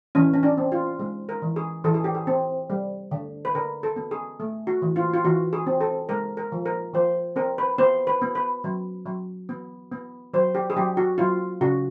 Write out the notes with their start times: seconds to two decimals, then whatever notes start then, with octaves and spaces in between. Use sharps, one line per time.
0.15 E3 C#4
0.34 C#4
0.43 D4
0.58 C4
0.72 F4
0.99 G#3
1.29 A#4
1.42 E3
1.56 G#4
1.84 E3 A4
1.94 G#4
2.04 G4
2.15 G#4
2.27 C4
2.70 G3
3.11 D3
3.45 B4
3.55 D3 A#4
3.83 A4
3.96 B3
4.11 G#4
4.40 A3
4.67 F#4
4.82 E3
4.96 F4
5.14 F4
5.24 E3 F#4
5.53 G#4
5.67 C4
5.81 A4
6.09 G#3 A#4
6.37 A#4
6.52 F3
6.66 A#4
6.94 F3 C5
7.36 C4 A#4
7.58 B4
7.78 B3 C5
8.07 B4
8.22 B3
8.35 B4
8.64 F#3
9.06 F#3
9.49 B3
9.92 B3
10.34 F#3 C5
10.55 G4
10.70 G#4
10.76 F#3 G4
10.97 F#4
11.18 F#3 F4
11.61 C#3 F#4